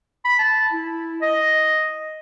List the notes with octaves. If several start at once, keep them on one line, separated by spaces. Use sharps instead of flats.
B5
A5
E4
D#5